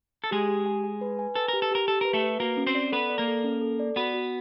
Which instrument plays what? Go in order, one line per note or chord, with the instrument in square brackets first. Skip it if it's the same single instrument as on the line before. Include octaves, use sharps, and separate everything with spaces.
[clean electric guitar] A4
[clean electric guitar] G#3 G#4 [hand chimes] G4
[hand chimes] G4
G#5
G#5
B4
G#5
[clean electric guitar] A4 [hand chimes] B4
[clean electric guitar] A#4
[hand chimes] G4
[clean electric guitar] A4
[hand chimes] G4 [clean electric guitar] A#4
[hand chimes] G4 [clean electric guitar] A4
[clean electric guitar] A#4 [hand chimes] B4
[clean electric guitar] A3 A4
[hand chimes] B4
[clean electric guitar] A#3 A#4 [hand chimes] F#4
[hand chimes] C#4
[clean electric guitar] C4 C5
[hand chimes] D5
[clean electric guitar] B3 B4 [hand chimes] A4
[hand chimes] D5
[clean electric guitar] A#3 A#4
[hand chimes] A4
C#4
A4
D5
[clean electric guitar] B3 B4 [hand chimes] F#4
[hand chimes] F#4